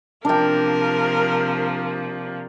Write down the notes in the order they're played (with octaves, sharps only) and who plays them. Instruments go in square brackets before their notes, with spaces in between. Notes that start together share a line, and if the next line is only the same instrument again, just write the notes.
[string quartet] C3 F3 A#3 [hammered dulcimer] D4 G5 [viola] A#4